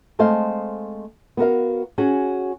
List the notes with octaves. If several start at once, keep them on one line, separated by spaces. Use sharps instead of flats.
G#3 A3 C4 C5 D#5 F5
B3 F#4 A#4 F5
C#4 F#4 G#4